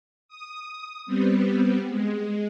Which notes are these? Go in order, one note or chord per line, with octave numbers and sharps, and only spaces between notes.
D#6
G3 B3 C4
G#3